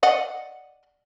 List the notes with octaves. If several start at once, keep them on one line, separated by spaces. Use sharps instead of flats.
D5 D#5 F#5